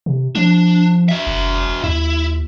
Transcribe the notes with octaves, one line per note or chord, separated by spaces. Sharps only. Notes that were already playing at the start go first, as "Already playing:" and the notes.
C3
F3 D4
F#4 E5
F#1
D#2 E4